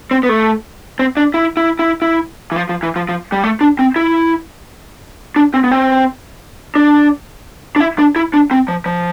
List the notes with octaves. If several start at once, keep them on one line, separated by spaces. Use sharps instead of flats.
C4
B3
A3
C4
D4
E4
E4
E4
E4
E3
F3
F3
E3
F3
F3
G3
A3
D4
C4
E4
D4
C4
B3
C4
D4
D4
E4
D4
E4
D4
C4
F3
F3